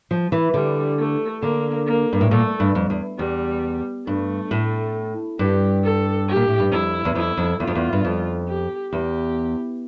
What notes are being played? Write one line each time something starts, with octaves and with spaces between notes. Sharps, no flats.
F3
E3
D3 G3
A3
D3 A#3
A#3
G2
A2
A#2 A3
G2
F2
E2
E2 G3
G2 A3
A2
G2 G4
A4
G4
A#2
A2
G2
F2 E4
E2
F2 E4
F2
E2 F4
F2
E2
G2
F2
G4
E2 G4